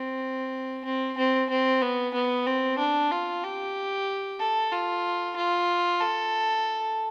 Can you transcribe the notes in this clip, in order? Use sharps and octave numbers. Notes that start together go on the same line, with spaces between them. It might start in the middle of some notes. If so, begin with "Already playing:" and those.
Already playing: C4
C4
C4
C4
B3
B3
C4
D4
F4
G4
A4
F4
F4
A4